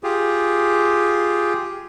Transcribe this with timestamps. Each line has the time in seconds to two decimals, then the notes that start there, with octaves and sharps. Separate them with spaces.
0.03 F4 G4 G#4